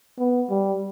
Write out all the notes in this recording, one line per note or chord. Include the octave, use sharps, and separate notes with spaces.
B3
G3